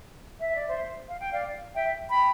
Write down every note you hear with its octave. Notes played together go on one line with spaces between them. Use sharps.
E5
D5
C5 E5
F5
G5
D5 F5
E5 G5
G5 B5